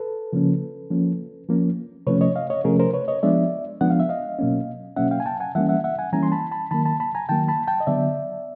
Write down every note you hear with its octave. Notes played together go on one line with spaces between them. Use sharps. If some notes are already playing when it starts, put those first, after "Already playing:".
Already playing: A4 B4
C#3 F3 A#3 C#4
F3 A#3 C#4
F3 A#3 C#4
C3 F3 A3 C#4 B4 C#5
C#5 D#5
D#5 F5
C#5 D#5
C3 F3 A3 C#4 G#4 A#4
A#4 C5
B4 C#5
C#5 D#5
F3 G#3 B3 D4 D5 E5
F3 G#3 B3 D4 F#5
F5
E5
D#5 F5
B2 F#3 A#3 C#4
B2 F#3 A#3 C#4 E5 F#5
F5 G5
G#5
G5 A5
F#5 G#5
E3 G3 A#3 C#4 E5 F#5
E5 F#5
E5 F#5
F#5 G#5
E3 G3 A#3 C#4 G#5 A#5
C6
A5 B5
A5 B5
D#3 F#3 A#3 A5 B5
A5 B5
A5 B5
G#5 A#5
D#3 F#3 A#3 G5 A5
A5 B5
G5 A5
D#5
D3 F#3 B3 D5 E5